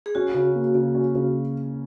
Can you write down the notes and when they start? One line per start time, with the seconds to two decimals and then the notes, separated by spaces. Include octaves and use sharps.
0.06 G#4
0.15 C#4 F#4
0.34 C#3
0.55 A#3
0.75 C#3
0.95 C#4
1.15 C#3